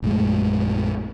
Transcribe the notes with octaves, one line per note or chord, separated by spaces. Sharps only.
A#1 F#2 G#3 A3